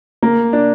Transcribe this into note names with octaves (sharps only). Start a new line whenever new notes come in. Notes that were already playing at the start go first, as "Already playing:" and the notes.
A#3
D4